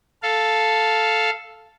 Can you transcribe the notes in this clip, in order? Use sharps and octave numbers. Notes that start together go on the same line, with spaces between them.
A4 F5